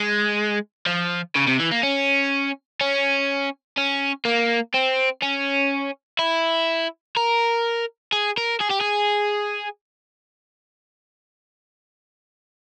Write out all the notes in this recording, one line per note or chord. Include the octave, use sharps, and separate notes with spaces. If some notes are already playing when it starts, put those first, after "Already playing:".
Already playing: G#3
F3
C#3
C3
E3
A#3
C#4
C#4
C#4
A#3
C4
C#4
E4
A#4
G#4
A#4
G#4
G4
G#4